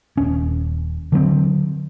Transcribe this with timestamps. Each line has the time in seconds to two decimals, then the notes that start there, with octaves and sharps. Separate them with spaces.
0.17 D#1 C#4
1.12 D3 F#3 A#3 C4